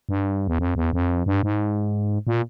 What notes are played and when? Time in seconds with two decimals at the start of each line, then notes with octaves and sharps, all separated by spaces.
0.09 G2
0.47 E2
0.59 F2
0.76 E2
0.93 F2
1.26 G2
1.43 G#2
2.27 A#2